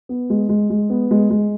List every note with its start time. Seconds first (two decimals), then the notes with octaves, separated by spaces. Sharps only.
0.09 B3
0.30 G#3
0.49 G#3
0.70 G#3
0.90 B3
1.11 G#3
1.30 G#3